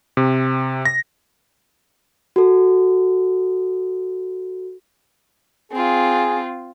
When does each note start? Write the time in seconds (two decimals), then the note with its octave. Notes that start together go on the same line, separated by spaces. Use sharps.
0.17 C3
0.85 A#6
2.36 F#4 A4
5.72 C4 F4 G#4